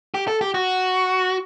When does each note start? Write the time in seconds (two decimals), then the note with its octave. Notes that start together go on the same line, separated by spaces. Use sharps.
0.14 G4
0.28 A4
0.41 G4
0.54 F#4